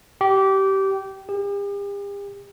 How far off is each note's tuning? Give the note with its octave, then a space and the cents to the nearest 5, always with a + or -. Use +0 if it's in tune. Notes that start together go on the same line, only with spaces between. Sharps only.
G4 -20
G4 +45